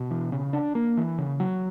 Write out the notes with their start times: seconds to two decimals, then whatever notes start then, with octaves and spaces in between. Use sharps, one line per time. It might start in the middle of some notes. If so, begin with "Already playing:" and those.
Already playing: B2
0.11 E3
0.32 C#3
0.53 D4
0.75 A#3
0.97 E3
1.18 C#3
1.40 F#3